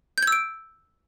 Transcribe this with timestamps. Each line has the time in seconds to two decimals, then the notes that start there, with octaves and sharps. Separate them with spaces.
0.18 G6
0.22 G#6
0.27 E6
0.32 D7